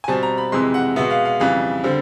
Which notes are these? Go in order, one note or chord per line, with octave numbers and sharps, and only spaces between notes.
G#5
B2 G3 C4 A5
A#5
B5
F2 C3 E3 G#3 C6
F#5
B2 G#3 B3 E5
F5
F5
F2 C#3 E3 G3 F5
D3 G3 C4